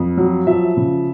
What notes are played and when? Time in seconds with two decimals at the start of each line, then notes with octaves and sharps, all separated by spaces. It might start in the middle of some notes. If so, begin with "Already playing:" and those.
Already playing: F2
0.17 F#3
0.47 F3 E5
0.77 C#3